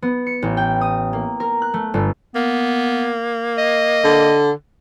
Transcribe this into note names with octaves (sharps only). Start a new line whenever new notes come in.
B3
C#7
A1
G5
D#6
A#3
A#4
F#6
A3
G1
A#3 B3
D#5
D3